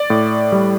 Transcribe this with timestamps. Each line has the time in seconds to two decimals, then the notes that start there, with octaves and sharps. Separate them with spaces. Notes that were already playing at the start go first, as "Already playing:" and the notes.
Already playing: D5
0.10 A2
0.52 G3